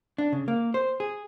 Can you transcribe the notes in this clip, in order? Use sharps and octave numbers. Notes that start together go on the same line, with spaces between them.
D4
C#3
A#3
C5
G#4